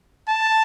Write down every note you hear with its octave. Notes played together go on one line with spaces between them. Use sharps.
A5